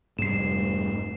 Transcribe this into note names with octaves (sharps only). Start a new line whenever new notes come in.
F1 G#2 G3 C7 E7